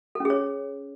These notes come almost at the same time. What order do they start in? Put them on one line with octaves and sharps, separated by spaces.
A4 C#4 G#4 C#5